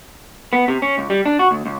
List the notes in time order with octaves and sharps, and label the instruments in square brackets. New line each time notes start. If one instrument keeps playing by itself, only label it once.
[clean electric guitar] B3
C3
C#4
C#2
G3
D4
F#4
D2
C#2